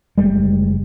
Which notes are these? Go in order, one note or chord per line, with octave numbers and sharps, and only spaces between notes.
F#1 G3 G#3